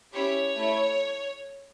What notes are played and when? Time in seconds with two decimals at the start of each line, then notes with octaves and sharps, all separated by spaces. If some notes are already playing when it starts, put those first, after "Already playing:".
0.13 C#4 E4 G4 C#5
0.55 A3 E4 A4